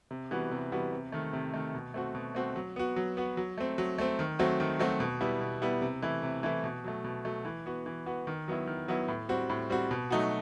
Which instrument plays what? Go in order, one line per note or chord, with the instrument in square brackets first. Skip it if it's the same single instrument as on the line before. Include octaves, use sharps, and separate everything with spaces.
[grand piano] C3
E3 G3 B3 F#4
C3
E3 G3 B3 F#4
C3
D#3 A3
C3
D#3 A3
B2
A3 C4 F#4
B2
A3 C4 F#4
F#3
B3 F#4
F#3
B3 F#4
F#3
A3 C4
F#3
A3 C4
D#3
F#3 A3 C4 F#4
D#3
F#3 A3 C4 F#4
B2
G3 B3 E4
B2
G3 B3 E4
C3
E3 A3 E4
C3
E3 A3 E4
B2
F#3 A3
B2
F#3 A3
E3
B3 F#4
E3
B3 F#4
D#3
F#3 B3 E4
D#3
F#3 B3 E4
A2
G3 C4 F#4
A2
G3 C4 F#4
B2
F#3 A3 D#4 F#4